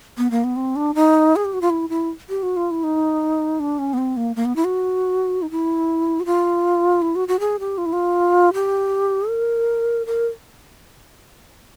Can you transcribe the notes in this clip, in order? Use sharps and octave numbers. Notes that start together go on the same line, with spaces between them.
B3
A#3
B3
C4
D4
D#4
G#4
G4
F#4
F4
E4
E4
G4
F#4
F4
E4
D#4
D4
C#4
B3
C4
A#3
A#3
B3
E4
F#4
D#4
E4
F#4
F4
E4
F#4
F#4
G#4
G4
F4
E4
F4
G4
A#4
A#4